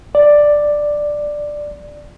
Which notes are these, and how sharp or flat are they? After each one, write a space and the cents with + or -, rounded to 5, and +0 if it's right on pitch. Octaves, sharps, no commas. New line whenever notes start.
D5 +5